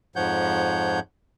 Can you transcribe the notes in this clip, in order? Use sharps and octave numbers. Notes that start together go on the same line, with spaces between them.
F2 G#2 F3 C#5 F#5 G6